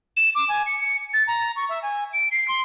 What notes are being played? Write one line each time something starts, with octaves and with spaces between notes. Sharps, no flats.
E7
D6
G#5
C#7
A6
A#5
C#6
E5
G#5
D7
C7
C6